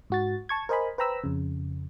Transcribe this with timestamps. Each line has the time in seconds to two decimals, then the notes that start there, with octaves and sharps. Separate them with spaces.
0.10 G#2 F#4 A6
0.49 A5 C#6 G#6
0.69 A#4 C5 D#5 G#5 B5
0.98 B4 C5 G5 A#5 B5 E6
1.23 F2 C#3